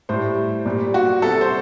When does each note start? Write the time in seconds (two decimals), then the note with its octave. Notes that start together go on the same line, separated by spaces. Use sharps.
0.09 A2 G3 C5
0.65 A#2 G3
0.94 F#4
1.22 C3 G3 A4
1.41 C5